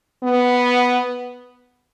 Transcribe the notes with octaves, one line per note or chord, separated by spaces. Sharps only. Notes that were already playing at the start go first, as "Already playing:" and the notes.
B3